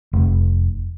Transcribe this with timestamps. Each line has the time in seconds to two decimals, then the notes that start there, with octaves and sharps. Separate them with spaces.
0.13 F1